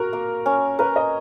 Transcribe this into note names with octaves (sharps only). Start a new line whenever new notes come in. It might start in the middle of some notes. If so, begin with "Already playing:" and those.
Already playing: F#4 A#4
A#3
C#4
A#4 B4
D#5